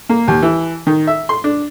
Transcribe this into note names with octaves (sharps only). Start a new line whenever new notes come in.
A#3
D#2
E3
D#3
E5
C6
D4